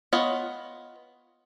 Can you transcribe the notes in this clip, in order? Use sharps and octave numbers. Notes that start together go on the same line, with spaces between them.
B3 F4 C#5 D#5